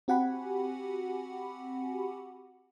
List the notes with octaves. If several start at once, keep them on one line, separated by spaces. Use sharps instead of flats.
C4 F#4 G4 F#5 G#5 B5